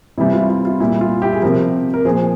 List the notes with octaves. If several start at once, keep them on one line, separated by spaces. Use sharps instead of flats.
C3 E3 G3 E4
F4
E4
F4
A#2 G3 E4
F4
E4 G4
G#4
C3 F3 G4 A#4
A#4
A#2 F3 G#4 C5